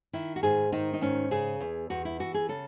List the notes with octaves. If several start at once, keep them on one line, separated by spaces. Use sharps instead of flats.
D#3 E4
F#4
G#2 G#4
D#3 D#4
D#4
G#2 C#4
C#3 G#4
E2
E2 F#4
E4
E3 F#4
G#4
C#3 A4